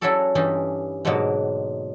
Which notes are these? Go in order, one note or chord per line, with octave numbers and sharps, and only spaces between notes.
F#3 C#4 E4 F#4 A4 D5
G2 E3 G3 C#4 D#4 A5
G#2 B2 D3 F#3 A#3